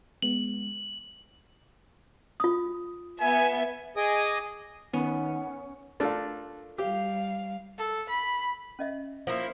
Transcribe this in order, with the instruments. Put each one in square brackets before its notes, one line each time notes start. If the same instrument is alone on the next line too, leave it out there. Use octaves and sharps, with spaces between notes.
[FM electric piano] G#3 B3 [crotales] F#7
[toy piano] F4 D#6
[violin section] B3 E5 [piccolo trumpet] G#5
[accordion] G#4 D#5 G#5 D6 D#6
[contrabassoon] D#3 [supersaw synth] B3 [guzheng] C#4 [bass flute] F#5
[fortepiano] A3 D4 [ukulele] F4 A4 A#4
[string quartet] G3 F5 [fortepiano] G4
[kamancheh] A4
B5
[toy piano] C#4 D#5 E5
[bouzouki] F3 A#3 E4